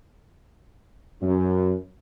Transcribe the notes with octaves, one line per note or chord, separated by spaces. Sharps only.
F#2